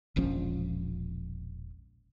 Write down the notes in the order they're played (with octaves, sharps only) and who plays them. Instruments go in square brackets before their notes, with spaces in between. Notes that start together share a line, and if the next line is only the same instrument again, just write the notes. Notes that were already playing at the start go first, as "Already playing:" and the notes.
[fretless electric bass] E1 A#1 F3 C#4